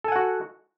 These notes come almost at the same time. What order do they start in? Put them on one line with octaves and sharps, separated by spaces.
A4 G#5 F#5 F#4